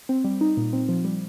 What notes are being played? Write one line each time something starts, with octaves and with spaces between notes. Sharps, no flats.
C4
G3
D#4
A#2
C4
F3
G3